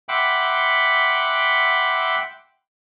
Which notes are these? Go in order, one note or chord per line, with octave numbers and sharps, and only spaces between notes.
E5 F#5 G5 B5 C6 D6